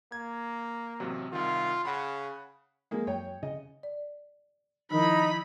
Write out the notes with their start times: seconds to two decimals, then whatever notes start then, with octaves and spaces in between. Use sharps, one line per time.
0.12 A#3 G#6
1.00 A1 C3 F#3
1.33 C2 D#3 F4
1.85 C#3 F#5 B5
2.91 G#3 A#3
3.07 F#2 C#5 G5
3.43 C#3 D#5
3.83 D5
4.91 D#3 F3 D#4 E4 A#4 B5